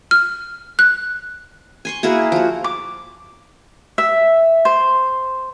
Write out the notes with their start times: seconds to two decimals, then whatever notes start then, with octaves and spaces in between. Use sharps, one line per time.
0.11 F6
0.79 F#6
1.85 G#5 C6 C#6
2.03 A#3 E4 F#4 G#4
2.32 F3 F#4
2.64 D6
3.98 E5
4.65 C5